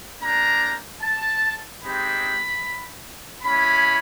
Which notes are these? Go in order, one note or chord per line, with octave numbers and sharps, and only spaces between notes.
A#3 D4 G4 A#5
A5
G#3 C4 D#4 G4 B5
G#3 C#4 E4 B5